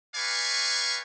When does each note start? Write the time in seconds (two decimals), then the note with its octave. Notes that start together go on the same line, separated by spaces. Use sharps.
0.15 G4 B4 D5 F5 G#5 C#6